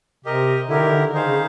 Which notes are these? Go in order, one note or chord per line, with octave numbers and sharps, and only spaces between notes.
C3 G4 A#4 D#5
D3 E4 G4 A#4
D#3
D3
D#3 D#4 G#4 C5 F5
C#3